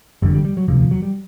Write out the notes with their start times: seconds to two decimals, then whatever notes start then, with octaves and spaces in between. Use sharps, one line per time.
0.22 F#1 F2 D3 G3
0.34 G3
0.45 G3
0.57 F#3
0.68 E1 D2 C3 F3
0.79 F3
0.91 F#3
1.02 G3